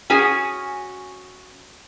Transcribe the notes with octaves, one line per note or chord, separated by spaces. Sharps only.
C#4 F#4 G#4 G#5